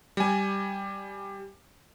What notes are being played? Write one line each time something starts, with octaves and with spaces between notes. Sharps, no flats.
G3 G#5